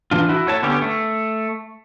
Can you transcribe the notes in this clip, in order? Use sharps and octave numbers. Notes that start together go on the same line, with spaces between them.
E3 D4 F4
E4 F#4
A3 C#5 A5
D3 B3 C#4 G4
A3